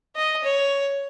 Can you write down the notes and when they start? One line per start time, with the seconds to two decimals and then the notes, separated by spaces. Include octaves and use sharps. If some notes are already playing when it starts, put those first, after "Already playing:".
0.16 D#5
0.44 C#5